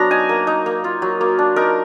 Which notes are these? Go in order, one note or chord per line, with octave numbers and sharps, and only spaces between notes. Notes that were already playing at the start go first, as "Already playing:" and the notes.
Already playing: F#3 B3 D4 A#5
D#4 G#5
A#3
D#4
A#3
F4
F#3
A#3
D4
D#4 A#4